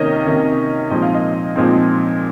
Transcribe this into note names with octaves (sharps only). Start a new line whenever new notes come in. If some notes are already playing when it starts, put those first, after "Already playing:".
Already playing: C3 D#3 A#3 C#4 C#5 D#5
C3 D#3 A#3 C#4
A#2 F3 G#3 C4 D#4 D#5
F5
D#5
A#2 F3 G#3 C4 D#4